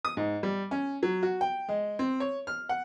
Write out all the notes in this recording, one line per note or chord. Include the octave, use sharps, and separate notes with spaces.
D#6
G#2
G3
C#4
F#3
F#4
G5
G#3
C4
C#5
F6
F#5